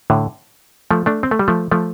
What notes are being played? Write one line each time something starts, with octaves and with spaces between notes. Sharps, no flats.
A2 D3
F3 A3
A3 D4
C4
A3
G3
F3 A3
F3 A3